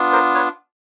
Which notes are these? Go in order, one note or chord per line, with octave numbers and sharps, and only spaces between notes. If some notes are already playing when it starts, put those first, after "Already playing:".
Already playing: B3 D4 F4
A#4 C5
B4 C#5